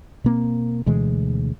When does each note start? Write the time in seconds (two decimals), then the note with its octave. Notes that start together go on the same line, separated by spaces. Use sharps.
0.24 B2 A#3 C4
0.86 D2 B2 E3 G#3